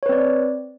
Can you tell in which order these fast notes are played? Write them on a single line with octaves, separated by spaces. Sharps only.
C#5 B4 C4 D5